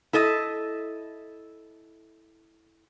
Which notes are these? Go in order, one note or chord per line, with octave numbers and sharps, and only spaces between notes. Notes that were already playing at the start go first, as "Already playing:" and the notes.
E4 A4 D#5